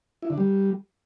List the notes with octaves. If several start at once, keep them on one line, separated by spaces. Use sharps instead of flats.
E4
D3
G3